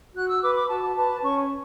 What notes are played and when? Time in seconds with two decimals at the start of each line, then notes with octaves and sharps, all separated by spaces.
0.15 F#4 F#6
0.29 E6
0.42 B4 D6
0.55 D6
0.69 F#4 A5
0.96 B4 A5
1.23 C#4 C#6